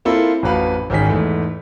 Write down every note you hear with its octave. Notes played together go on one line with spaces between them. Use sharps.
A#3 C4 E4 F4 A4
A1 F2 F#4 B4 F5
G#1 D#3 C#4 G#4 B6
E2 G#2 A3